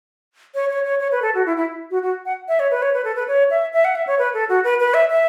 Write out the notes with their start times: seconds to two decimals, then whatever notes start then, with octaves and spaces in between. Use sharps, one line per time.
0.55 C#5
0.69 C#5
0.84 C#5
1.00 C#5
1.12 B4
1.22 A4
1.35 F#4
1.46 E4
1.57 E4
1.91 F#4
2.03 F#4
2.25 F#5
2.48 E5
2.60 C#5
2.71 B4
2.82 C#5
2.94 B4
3.04 A4
3.16 B4
3.28 C#5
3.50 E5
3.73 E5
3.85 F#5
3.95 E5
4.07 C#5
4.19 B4
4.34 A4
4.49 F#4
4.64 B4
4.80 B4
4.94 E5
5.10 E5